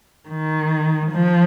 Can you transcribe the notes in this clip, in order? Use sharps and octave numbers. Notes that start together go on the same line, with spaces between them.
D#3
F3